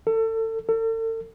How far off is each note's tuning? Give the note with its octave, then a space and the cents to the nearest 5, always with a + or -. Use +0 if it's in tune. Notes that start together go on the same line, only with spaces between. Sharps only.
A4 +30
A4 +40